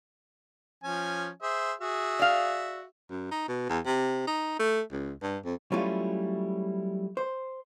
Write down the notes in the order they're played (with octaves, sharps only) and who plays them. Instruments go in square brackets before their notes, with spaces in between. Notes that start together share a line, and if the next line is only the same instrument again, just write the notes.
[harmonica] F3 C#4 G#5
G#4 C5 E5
F#4 G#4 E5
[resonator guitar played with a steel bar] D5 F5
[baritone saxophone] F#2
D#4
B2
E2
C3
D#4
A3
C#2
G2
F2
[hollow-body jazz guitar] F#3 G3 A3 C#4 E4 F4
C5